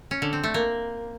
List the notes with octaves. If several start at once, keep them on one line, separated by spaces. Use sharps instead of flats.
C#4
D3
C4
A3
A#3